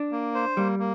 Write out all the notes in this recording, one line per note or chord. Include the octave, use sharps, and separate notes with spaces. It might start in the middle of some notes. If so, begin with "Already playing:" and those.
Already playing: D4
A#3
C5
G3 A#3
A#3